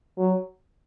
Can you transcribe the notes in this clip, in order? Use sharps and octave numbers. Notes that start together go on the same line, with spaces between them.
F#3